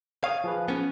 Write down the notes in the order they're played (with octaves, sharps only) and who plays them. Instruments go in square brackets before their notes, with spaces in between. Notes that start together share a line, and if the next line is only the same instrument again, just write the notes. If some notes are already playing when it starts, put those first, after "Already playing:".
[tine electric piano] C#5 D#6 [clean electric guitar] F5
[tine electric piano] F3 G#4 B4
[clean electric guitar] B3 C#4